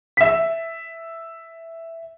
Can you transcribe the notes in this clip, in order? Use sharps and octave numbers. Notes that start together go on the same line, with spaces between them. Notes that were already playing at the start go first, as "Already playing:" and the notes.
E5 B6